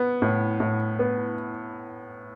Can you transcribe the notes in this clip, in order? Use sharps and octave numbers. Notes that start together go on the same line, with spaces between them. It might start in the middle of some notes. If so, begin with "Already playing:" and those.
Already playing: B3
A2
A2
B3